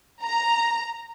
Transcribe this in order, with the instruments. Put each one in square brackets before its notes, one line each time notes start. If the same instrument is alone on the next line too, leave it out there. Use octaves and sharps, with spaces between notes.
[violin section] A#5